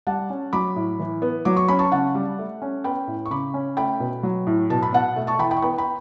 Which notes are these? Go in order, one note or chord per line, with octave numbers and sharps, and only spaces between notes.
G3 F#5 A5
C#4
F#3 B5 D6
A2
E3
B3
F#3 D6
C#6
C#4 B5
A5 C#6
C#3 F#5 A5
G3
A3
C#4
B3 G5 B5
A2
C#6
C#3 B5 D6
C#4
A3 G5 B5
B2
F#3
A2
B2 A5
B5
B2 F#5 A5
A3
A5 C#6
E3 G5 B5
G5 B5
C#6
B3 G5 B5
G5 B5